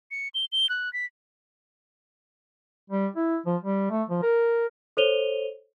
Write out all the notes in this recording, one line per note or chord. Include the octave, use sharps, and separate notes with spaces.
C#7
G7
G7
F#6
B6
G3
E4
F3
G3
A3
F3
A#4
A4 C5 C#5 D#7 F7 G7